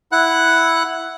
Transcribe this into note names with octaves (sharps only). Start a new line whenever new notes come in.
E4 F#5 F#6